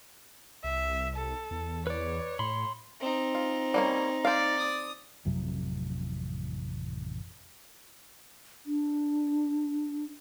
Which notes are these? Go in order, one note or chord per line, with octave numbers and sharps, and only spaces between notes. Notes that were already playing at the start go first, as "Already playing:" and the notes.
C2 E5
A4
E2
B4 C#5 D5
A2 B5 C6
C4 D#4
F4
G3 A#3 C#4
C5 D5 F5
D#6
A1 F2 C3 F#3
D4